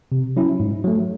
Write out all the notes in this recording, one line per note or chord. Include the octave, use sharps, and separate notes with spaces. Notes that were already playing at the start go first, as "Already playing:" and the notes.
C3
F#3 C#4 E4
G#2
F#3 A3